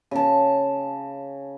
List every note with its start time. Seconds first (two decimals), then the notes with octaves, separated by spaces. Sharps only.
0.11 C#3 A5